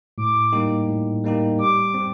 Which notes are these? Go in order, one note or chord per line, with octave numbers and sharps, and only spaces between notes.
A2 D6
G3 A#3 D#4 G4
A2
G3 A#3 D#4 G4
G3 D6
C4 G4